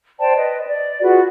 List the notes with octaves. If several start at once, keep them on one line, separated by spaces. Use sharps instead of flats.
C5 D5 G5 A5
B4 D#5
D5
F4 F#4 G#4 B4